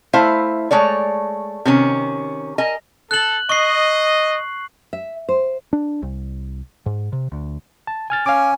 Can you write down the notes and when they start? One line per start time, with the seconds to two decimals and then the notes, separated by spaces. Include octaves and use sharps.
0.13 A3 E4 C5 F5
0.71 G#3 A3 C#5 D5
1.65 C3 D#3 C#4
2.58 A#4 D#5 G#5
3.11 A4 F#6 F#7
3.49 D#5 C#6 C7
4.93 E5
5.29 C5
5.73 D4
6.02 C2
6.86 G#2
7.13 C3
7.32 D2
7.87 A5
8.10 G#5 F6 A6
8.26 C#4 F5 G#5 D6